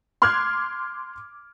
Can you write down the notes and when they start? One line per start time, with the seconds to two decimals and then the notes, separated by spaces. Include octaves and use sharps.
0.22 C6 D6 F6 F#6 G#6